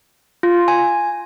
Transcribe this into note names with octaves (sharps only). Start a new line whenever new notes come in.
F4
G#5